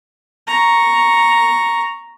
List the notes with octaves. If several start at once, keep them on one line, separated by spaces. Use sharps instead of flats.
A#5 C#6